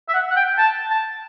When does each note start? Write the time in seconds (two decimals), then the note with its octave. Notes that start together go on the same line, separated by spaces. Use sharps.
0.09 E5
0.13 F#5
0.30 F#5
0.36 G5
0.58 A5
0.90 A5